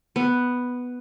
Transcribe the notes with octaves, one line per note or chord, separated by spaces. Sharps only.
B3